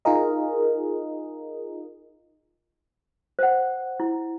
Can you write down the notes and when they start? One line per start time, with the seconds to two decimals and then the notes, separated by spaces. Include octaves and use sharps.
0.05 D#4 F4 G#4 A#4 D#5
3.39 C5 F#5
4.00 E4